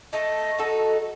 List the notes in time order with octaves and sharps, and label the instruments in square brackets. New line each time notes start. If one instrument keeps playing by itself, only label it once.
[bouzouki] A3 [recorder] D#5
[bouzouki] D#4 F#4 A4